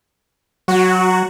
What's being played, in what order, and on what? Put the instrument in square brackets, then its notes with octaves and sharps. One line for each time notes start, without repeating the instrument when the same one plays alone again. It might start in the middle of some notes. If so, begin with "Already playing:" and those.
[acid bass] F#3 [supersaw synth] F#4